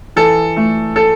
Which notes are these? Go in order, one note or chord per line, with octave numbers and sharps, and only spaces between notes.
E3 A4
A3
A4